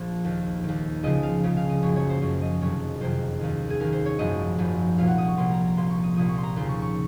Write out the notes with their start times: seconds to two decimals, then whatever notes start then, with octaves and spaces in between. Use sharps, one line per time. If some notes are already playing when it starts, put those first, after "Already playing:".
Already playing: A#1 A#2 F3
0.24 D#2 D#3
0.64 D#2 D#3
1.03 C#2 C#3 F3 D#5
1.23 F5
1.43 C#2 C#3 F3
1.57 F5
1.69 D#5
1.82 F#1 F#2 F3 C#5
1.96 C#5
2.09 C5
2.22 F#1 F#2 F3 C#5
2.42 D#5
2.61 F#1 F2 C3 D#3 C#5
3.00 F#1 F2 C3 D#3 C5
3.41 D#2 D#3
3.70 G#4
3.80 D#2 D#3 A#4
3.92 C5
4.06 C#5
4.19 G#1 F#2 F3 D#5
4.58 G#1 F#2 F3
4.98 C2 A#2 F3 F5
5.07 F#5
5.18 D#6
5.28 C#6
5.37 C2 A#2 F3 C6
5.51 A#5
5.65 A#5
5.77 C2 A#2 F3 C6
5.90 C#6
6.03 D#6
6.16 C2 A#2 F3 D#6
6.29 C#6
6.38 C6
6.43 A#5
6.56 D#2 C#3 F3 C6
6.69 C#6
6.82 C#6